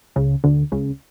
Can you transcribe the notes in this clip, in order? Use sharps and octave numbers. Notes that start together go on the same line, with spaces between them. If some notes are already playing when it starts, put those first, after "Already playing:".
C#2 C#3
D2 D3
C#2 C#3